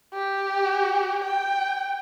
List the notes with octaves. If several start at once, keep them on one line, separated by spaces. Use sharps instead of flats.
G4
G5